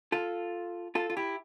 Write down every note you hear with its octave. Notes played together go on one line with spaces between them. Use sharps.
F4 A4
F4 A4
F4
E4 G4